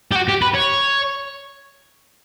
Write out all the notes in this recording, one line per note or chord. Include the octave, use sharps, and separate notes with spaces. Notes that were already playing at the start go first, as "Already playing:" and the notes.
G4
F#4
G4
B4
C#5